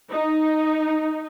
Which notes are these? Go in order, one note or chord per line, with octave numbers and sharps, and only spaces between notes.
D#4